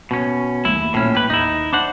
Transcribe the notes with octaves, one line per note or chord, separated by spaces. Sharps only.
B2 C#4
D#2 A3 E4
A#1 A2 C#4
A2 G4 B4
D#2 D#4 E4
D4 C5 F#5